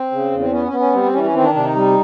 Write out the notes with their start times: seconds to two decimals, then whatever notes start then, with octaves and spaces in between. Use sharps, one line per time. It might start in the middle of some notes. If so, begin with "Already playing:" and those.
Already playing: C4
0.12 C#3
0.31 E2
0.39 C4
0.51 B3 C#4
0.66 C#4
0.72 B3
0.80 C#4
0.93 G3 C4
1.03 C4
1.13 E3 C#4
1.23 C#4
1.33 D#3 C4
1.44 D4
1.54 C3 D4
1.65 D#4
1.75 G3